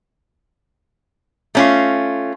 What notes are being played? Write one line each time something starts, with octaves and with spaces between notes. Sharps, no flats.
A3 C#4 F4